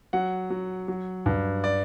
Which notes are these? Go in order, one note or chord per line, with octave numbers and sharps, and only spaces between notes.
F#3 F#5
F#3
F#3
G2
D5